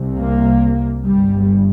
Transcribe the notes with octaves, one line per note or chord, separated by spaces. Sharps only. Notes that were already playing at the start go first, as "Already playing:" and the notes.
Already playing: C2 C3
A#3
G1 G2 G3